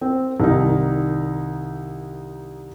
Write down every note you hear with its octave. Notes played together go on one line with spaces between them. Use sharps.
C4
C2 D#3 D#4